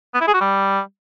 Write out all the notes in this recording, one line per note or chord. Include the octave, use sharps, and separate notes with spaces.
B3
E4
G#4
F#4
G3